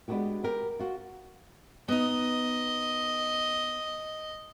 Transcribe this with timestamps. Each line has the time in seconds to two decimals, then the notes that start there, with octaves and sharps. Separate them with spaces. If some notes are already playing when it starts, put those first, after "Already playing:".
0.08 G#3 B3 D4 D#4 F#4 G4
0.44 G4 A#4
0.79 F4 F#4
1.88 B3 D#4 D#5